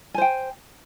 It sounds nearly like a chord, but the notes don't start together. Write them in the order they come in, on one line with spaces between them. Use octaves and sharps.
G#5 C5 G5